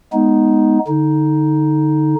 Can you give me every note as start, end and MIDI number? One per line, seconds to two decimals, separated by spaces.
0.13 0.79 56
0.13 0.79 59
0.13 0.79 63
0.88 2.15 50
0.88 2.15 63